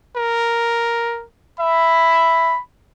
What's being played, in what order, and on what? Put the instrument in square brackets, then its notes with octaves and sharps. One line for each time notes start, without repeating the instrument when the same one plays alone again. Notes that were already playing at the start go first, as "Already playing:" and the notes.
[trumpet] A#4
[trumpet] E5 [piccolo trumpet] B5